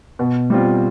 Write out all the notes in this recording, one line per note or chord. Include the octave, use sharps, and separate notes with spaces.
B2
G3 C4 F4